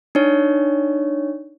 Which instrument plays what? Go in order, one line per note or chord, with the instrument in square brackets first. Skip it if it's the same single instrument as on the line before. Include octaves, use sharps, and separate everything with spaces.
[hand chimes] D4 D#4 C#5